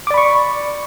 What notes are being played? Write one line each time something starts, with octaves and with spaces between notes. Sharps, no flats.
D5 B5 C#6 D6